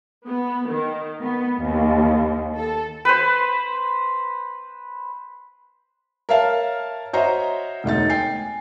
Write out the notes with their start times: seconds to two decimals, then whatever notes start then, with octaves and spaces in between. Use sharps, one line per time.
0.28 B3
0.69 D#3
1.21 B3
1.61 D#2
2.57 A4
3.05 B4 C5
6.29 A#4 C#5 E5 F5 A5 F6
7.13 F#4 C5 C#5 D#5 E5 A#5
7.84 E1 D2 D#4 A6
8.10 G5 G#5 C7